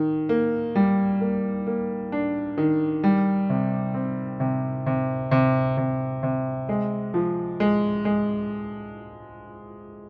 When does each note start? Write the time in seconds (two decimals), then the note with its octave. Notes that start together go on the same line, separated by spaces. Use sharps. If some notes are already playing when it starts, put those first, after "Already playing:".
Already playing: D#3
0.29 A#3
0.75 G3
1.21 A#3
1.67 A#3
2.12 D4
2.58 D#3
3.04 G3
3.50 C3
3.94 C4
4.40 C3
4.86 C3
5.31 C3
5.77 C3
6.23 C3
6.69 G#3
7.14 F3
7.60 G#3
8.05 G#3